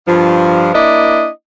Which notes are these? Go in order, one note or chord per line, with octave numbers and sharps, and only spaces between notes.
G2 F3
A#3 D4 E4 D#5